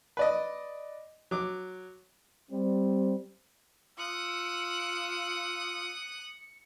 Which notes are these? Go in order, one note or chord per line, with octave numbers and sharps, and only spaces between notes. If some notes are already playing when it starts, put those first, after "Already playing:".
B4 D5 D#5
F#3 D6
G3 C4
F4 D#6 E6 F#6 C#7